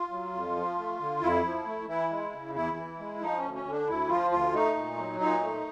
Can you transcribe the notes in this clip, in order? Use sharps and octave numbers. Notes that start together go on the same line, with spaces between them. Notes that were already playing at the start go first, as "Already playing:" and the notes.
Already playing: F4
F#3
F2
F3
A3
D3
F2 E4
F3
A3
E3 E4
G#3
C#3
E2 E4
E3
G#3
F3 D#4
C#4
D2
C#4
D3
D4
D2 E4
F3 F4
D2 F4
A3 D#4
A#2
F#3
A#2 D#4
A3